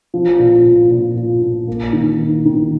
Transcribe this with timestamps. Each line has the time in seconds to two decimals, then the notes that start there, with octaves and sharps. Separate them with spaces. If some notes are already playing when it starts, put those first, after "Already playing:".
0.14 F3
0.39 A#2
0.65 A#2
0.91 A#2
1.16 A#2
1.42 A#2
1.68 A#3
1.93 D#3
2.19 D#3
2.45 D#3